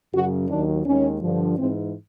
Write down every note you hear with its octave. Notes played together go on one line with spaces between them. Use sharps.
F#2 C#3 F#3 F#4
D#2 D#3 F#3 D4
D#2 D#3 G#3 C#4
G2 D3 F3
G#2 E3 G#3 C4